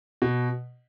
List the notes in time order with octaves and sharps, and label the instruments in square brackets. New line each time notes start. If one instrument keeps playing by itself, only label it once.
[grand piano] B2